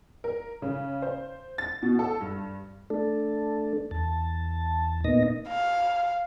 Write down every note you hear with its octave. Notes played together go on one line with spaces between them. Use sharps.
A#4
C#3
C5
A6
B2
A4
G2
A3 D4 A4
E2 A5
A#2 A#3 B3 D#4 D#5 A#6
F5